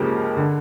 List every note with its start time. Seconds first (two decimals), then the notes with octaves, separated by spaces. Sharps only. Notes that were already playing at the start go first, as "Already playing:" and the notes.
Already playing: C#2 C#3 F3 A#3 G4
0.37 D3